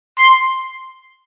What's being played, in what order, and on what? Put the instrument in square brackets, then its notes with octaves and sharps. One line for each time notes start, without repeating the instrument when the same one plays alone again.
[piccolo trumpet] C6